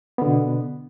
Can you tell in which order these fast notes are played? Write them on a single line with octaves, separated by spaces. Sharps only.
B3 D3 B2